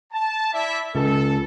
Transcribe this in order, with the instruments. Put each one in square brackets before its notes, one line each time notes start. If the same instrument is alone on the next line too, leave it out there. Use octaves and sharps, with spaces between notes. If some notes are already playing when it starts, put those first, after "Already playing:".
[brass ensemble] A5
E4 D5 E5
[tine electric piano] C#2 [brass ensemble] A4